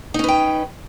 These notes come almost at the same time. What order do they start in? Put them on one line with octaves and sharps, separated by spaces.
D#4 C#4 B4 G5